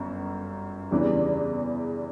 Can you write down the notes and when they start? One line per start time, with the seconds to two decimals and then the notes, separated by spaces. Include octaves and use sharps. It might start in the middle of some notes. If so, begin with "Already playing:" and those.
Already playing: G1 F#2
0.91 E2 C#3 E3 G3 D4